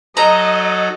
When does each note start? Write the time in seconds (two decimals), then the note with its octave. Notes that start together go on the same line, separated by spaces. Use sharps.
0.17 F#3 D#4 A4 D#5 A#5